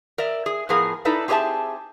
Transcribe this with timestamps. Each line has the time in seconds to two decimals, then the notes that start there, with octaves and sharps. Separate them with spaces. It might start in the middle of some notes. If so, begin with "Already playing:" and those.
0.18 A#4 D5 E5
0.46 G#4
0.69 A2 F3 B3 G#4 A#4
1.05 D#4 E4 A4 B4 D5
1.28 C4 G4 G#4 C5 E5 A5